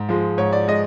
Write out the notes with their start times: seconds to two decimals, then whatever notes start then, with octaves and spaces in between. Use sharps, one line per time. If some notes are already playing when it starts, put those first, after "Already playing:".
Already playing: G#2
0.09 F3 G#3
0.38 G#2 C#5
0.53 D5
0.68 G#3 D#5